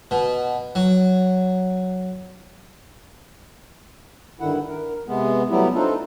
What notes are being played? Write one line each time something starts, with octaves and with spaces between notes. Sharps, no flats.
B2
F#3
G2 D3 D#3 E4 F#5
A#4
C3 G#3 B3
F#3 G3 A3 B3 E4 G4
C4 D4 D#4 F4 A4